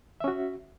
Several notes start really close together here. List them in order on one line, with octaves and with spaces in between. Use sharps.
E5 C#4 F#4